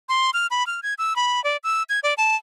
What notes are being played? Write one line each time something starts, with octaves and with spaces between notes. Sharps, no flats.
C6
F6
B5
F6
G#6
E6
B5
D5
E6
G#6
D5
A5